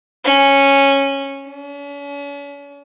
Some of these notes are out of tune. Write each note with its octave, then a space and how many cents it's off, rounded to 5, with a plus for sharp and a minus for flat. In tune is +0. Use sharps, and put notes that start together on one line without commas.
C#4 -10
C#4 +45